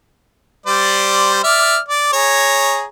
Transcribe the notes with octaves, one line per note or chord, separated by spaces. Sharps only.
G3 C5 D5
D5 E5 F6
D5
G#4 C#5 A#5